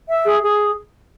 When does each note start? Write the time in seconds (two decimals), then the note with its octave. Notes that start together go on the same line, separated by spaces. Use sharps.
0.09 E5
0.26 G#4
0.42 G#4